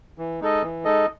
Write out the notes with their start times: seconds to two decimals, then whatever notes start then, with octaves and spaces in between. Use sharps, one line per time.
0.18 E3
0.41 G#3 D#4 A4 D#5
0.63 E3
0.85 G#3 D#4 A4 D#5